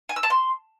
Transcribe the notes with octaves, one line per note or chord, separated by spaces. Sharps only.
G#5
E6
A5
C6